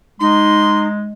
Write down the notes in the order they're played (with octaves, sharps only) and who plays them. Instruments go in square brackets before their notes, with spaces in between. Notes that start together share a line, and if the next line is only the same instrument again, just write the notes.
[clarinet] G#3 [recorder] D#4 [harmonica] C6